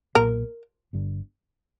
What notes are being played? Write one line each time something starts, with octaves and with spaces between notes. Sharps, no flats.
B1 A#2 A#3 A#4
G1 G2 D3